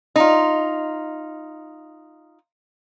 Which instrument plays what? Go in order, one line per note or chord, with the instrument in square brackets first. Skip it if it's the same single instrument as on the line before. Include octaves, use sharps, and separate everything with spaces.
[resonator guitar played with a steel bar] D#4 F4